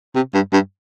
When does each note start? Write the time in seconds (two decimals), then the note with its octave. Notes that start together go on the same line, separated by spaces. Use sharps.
0.15 C3
0.34 G2
0.53 G2